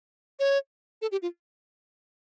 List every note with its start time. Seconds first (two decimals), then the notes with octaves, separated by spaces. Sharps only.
0.40 C#5
1.02 A4
1.12 G4
1.22 F4